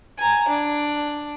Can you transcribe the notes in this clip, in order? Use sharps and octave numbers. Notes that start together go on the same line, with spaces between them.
G#5 A#5
D4